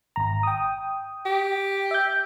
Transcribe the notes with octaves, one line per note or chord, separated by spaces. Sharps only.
G#1 A#5
G5 D#6
G4
E5 G6